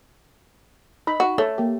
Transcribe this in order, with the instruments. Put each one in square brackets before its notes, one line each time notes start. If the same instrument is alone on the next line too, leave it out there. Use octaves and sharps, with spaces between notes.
[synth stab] D#4 [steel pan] B5
[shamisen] F#4
[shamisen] A3 [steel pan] A4 C#5 A5
[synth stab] A#3 G4